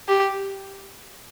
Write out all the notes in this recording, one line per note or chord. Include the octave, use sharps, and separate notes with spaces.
G4